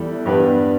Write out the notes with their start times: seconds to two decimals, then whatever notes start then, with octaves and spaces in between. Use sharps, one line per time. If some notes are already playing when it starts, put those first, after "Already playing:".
Already playing: E2 E3 G3 E4 A4
0.26 G2 G3 B3 D4 B4